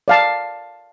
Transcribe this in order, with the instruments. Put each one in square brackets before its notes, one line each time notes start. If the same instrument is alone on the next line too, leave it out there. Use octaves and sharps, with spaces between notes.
[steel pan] D5 F5 A5